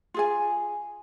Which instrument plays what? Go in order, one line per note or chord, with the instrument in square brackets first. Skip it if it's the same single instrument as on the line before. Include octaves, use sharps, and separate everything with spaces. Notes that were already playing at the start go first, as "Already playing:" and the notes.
[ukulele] F4 G#4 G#5